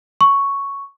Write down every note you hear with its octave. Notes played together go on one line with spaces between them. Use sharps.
C#6